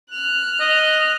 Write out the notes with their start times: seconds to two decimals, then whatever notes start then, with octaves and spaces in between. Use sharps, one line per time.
0.11 F6 F#6
0.60 D#5